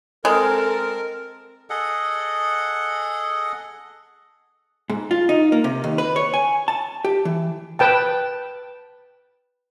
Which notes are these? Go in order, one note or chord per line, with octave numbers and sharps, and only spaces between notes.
G#3 C4 A4 A#4
G#4 A4 D#5 F#5
G#2
F4
D#4
A#3
C3
D#2
B4
C#5
G#5
A5
G4
E3
B4 G5 A5